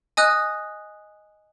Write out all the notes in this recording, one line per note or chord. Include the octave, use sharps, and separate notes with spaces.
D#5 G#5 D#6 F#6